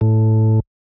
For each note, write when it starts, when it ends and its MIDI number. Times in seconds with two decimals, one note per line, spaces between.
0.01 0.60 45